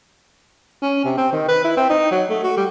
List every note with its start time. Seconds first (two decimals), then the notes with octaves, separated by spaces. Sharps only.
0.82 C#4
1.04 C3
1.17 C4
1.32 D#3
1.48 B4
1.64 E4
1.77 C4
1.90 D#4
2.11 F#3
2.29 A3
2.43 F#4
2.57 G3